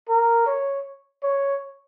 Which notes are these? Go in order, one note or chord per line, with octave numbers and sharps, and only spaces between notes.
A#4
C#5
C#5